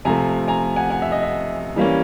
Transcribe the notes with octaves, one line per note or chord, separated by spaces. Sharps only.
C3 F3 A3 G#5 A#5
G#5 A#5
F#5 G#5
F#5 G#5
E5
D#5
E5
E3 G3 A#3 C#4